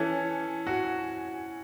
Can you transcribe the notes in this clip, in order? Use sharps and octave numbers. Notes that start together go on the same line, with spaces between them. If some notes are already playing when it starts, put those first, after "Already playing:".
Already playing: E3 C#4 A4
F#4